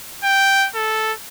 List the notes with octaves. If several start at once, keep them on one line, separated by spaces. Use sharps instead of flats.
G5
A4